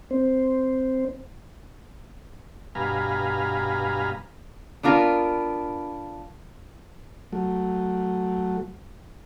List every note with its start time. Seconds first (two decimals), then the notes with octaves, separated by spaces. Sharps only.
0.11 C4 C5
2.75 G2 B2 F5 G#5 A#5 B5
4.83 B3 D4 F4 A#4
7.32 F#3 A3